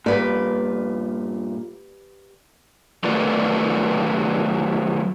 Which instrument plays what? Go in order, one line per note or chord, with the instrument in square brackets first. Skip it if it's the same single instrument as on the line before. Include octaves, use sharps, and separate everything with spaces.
[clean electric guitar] G2 A#2 [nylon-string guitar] G4 B4 D5
[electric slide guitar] D#3 F#3 A3 F4 B4 D5